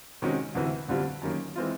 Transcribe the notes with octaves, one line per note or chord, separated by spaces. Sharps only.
C3 D#3 G#3 C#4 F#4
D2 C3 E3
D2 D3 G3 C4 F4
F#2 D#3 F#3 A#3 C#4
E3 G#3 C4 F4